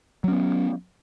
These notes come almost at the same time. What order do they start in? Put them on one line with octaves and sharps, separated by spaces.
F#3 C#4 B3